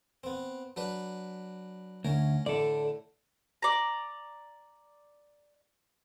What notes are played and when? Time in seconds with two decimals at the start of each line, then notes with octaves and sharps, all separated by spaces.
0.24 B3 C4
0.76 F#3 D4 B4
2.05 D2 C#4 A#4
2.46 A2 D3 A4 D5
3.62 D5 A#5